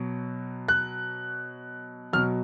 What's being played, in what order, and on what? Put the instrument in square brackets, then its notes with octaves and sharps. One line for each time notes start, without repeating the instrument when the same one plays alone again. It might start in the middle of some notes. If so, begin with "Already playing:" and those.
Already playing: [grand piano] B2 F#3
F#6
B2 F#3 F6